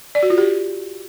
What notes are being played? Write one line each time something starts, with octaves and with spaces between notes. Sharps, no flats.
D5
F#4
F4
G4